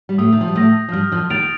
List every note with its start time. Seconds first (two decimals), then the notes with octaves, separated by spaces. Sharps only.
0.09 G3
0.18 A2 A3 D#6
0.32 D#3
0.41 F3
0.48 G3
0.55 A2 A3 G6 A#6
0.89 F3
0.92 G2 G3 F6
1.12 F2 F3
1.30 D#2 D#3 A6 D7 F7